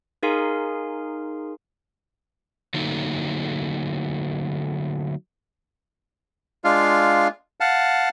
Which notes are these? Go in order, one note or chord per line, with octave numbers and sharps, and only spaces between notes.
D#4 G#4 A#4 F5 G#5 C6
D3 F#3 A3 A#3 D#4
G#3 D4 F4 F5
F5 F#5 A5